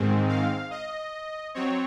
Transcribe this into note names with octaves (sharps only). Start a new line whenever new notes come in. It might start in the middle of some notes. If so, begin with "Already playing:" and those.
Already playing: G#2 D#3 G#3 C4
F5
D#5
F#3 C4 C#5